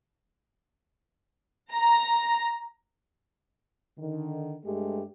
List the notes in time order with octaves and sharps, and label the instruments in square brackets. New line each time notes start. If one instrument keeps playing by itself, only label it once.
[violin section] A#5
[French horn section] D3 D#3
G2 G#3 A3 G4